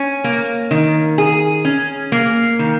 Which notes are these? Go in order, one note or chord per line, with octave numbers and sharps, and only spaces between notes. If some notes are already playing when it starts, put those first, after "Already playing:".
Already playing: C#4
A#3
D#3
G#4
C#4
A#3
D#3